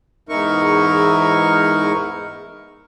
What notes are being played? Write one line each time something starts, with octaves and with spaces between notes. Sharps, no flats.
E2 G#2 D#4 E4 A#4 C#6